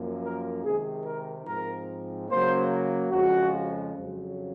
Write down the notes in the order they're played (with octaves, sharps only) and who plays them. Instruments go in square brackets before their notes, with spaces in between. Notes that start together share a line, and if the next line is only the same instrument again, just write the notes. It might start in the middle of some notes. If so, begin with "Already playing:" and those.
Already playing: [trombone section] F#2 F3 A#3
A#4
C3 D#3 G#3 G#4
A#4
G#2 F3 C4 A#4
C#3 F#3 A#3 C5
F2 C#3 F3 G#3 F#4
F2 C#3 F#3